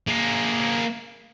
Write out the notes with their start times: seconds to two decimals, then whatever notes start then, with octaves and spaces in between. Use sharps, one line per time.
0.08 A#3 G#4